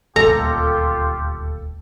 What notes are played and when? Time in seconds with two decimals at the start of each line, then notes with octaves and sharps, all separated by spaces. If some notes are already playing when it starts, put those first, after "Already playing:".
0.16 D#1 D2 F4 G4 A4 A#5